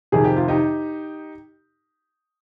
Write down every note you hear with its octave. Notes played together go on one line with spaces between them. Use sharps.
F2 C3 D#3 G#4
G4
F4
D#4 G4